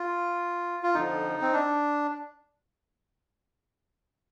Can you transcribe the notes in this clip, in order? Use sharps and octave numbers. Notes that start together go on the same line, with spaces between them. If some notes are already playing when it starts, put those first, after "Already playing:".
Already playing: F4
F4
F2 D3 F3 D#4
C4
D4